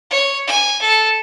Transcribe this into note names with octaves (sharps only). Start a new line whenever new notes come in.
C#5
G#5
A4